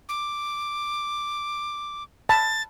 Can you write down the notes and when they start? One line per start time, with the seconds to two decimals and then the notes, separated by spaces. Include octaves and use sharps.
0.09 D6
2.29 A5 B5 A6